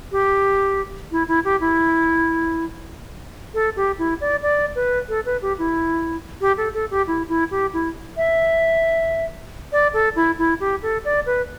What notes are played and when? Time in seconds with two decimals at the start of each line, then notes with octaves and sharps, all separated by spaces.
0.12 G4
1.12 E4
1.28 E4
1.45 G4
1.60 E4
3.54 A4
3.76 G4
3.99 E4
4.21 D5
4.43 D5
4.75 B4
5.09 A4
5.26 B4
5.42 G4
5.58 E4
6.41 G4
6.57 A4
6.74 A4
6.91 G4
7.07 E4
7.29 E4
7.51 G4
7.73 E4
8.17 E5
9.72 D5
9.94 A4
10.16 E4
10.39 E4
10.60 G4
10.82 A4
11.05 D5
11.26 B4